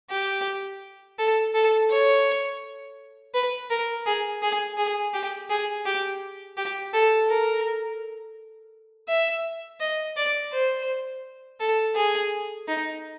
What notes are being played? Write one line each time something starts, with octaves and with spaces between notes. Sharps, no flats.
G4
A4
A4
C#5
B4
A#4
G#4
G#4
G#4
G4
G#4
G4
G4
A4
A#4
E5
D#5
D5
C5
A4
G#4
D#4